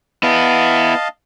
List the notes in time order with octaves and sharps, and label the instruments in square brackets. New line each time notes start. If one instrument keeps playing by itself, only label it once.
[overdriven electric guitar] B3 E4 [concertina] D#5 F5 A5